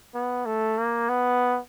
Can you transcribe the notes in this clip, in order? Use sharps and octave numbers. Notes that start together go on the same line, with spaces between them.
B3
A3
A#3
B3